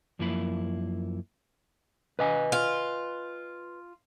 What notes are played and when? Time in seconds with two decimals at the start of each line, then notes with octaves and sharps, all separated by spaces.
0.19 F#2 F3 A#3 E4 B5
2.19 B4 D#5 G#5
2.52 F4